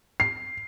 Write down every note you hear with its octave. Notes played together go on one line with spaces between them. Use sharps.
C7